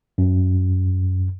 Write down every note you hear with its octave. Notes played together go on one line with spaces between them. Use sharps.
F#2